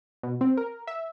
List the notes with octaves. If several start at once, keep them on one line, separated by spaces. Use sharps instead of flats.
B2
C4
A#4
E5